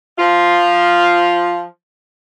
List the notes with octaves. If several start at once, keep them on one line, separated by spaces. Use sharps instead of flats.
F3 F4